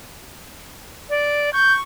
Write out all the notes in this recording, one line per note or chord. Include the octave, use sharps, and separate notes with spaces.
D5
C#6 G6